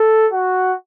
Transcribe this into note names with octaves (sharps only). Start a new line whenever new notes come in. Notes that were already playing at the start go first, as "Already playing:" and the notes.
Already playing: A4
F#4